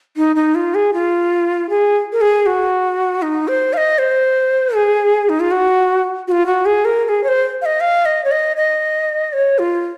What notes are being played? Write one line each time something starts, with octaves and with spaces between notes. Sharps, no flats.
D#4
D#4
F4
G#4
F4
G#4
A#4
G#4
F#4
D#4
C5
F5
D#5
C5
G#4
D#4
F4
F#4
F#4
F4
F#4
G#4
A#4
A#4
G#4
C#5
C5
F5
D#5
F5
D#5
C#5
D#5
D#5
C#5
F4